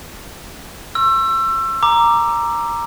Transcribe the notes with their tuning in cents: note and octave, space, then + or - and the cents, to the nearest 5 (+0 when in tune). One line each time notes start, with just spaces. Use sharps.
C#6 -45 E6 +25
A#5 +0 D6 +5